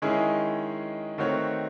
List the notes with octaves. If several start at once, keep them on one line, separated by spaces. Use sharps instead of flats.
D#3 G#3 C#4 E4 G#4
D#3 A3 C4 F#4 C#5